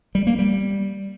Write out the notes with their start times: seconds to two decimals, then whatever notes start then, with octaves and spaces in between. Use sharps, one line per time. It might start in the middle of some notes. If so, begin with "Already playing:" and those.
0.15 G3
0.27 A#3
0.39 G3